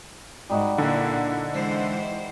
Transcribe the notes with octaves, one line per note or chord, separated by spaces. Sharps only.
G#2 G3 D#4 F#4
A#2 D3 E4
E3 G#3 C5